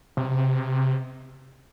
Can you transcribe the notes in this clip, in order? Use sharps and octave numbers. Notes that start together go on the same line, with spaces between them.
C3